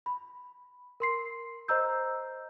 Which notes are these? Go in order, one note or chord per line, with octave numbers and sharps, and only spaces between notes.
B5
A#4 C6 C7
C5 D#5 A#5 E6 G6